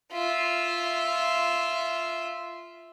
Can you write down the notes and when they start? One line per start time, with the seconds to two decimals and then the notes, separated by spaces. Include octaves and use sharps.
0.13 F4 E5